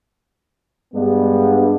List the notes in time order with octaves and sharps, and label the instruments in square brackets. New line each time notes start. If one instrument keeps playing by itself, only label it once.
[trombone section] G2 G#3 B3 D4